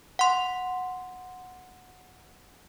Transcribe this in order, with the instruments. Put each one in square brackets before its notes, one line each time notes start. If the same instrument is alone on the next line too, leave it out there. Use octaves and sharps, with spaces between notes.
[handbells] F#5 C6